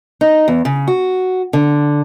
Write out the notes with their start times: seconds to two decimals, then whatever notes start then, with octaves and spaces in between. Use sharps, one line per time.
0.21 D#4
0.48 E2
0.65 C#3
0.87 F#4
1.53 D3